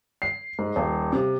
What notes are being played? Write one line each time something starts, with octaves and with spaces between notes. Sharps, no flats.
C7
G#2
D#1
C3